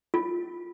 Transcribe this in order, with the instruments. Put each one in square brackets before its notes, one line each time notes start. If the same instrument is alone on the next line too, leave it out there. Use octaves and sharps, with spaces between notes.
[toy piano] F4